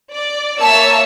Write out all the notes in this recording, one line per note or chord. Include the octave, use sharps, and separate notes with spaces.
D5
A#3 C#5 E5 A5 E6